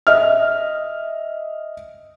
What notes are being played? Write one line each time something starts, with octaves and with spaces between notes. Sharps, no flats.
D#5 E5 F6